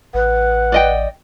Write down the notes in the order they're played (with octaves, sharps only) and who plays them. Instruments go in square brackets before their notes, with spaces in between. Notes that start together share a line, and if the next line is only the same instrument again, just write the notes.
[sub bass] A1 [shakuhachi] B4 [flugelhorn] F#5
[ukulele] D5 D#5 G5